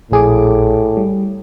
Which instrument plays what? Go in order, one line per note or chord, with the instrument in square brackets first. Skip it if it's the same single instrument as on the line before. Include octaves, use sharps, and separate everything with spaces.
[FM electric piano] A#1 G#4 D6 [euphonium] A2
[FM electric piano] G3